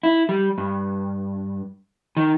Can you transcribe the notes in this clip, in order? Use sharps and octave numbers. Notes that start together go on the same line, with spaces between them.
E4
G3
G2
D#3